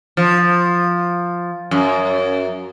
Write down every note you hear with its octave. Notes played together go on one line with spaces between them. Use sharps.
F3
F#2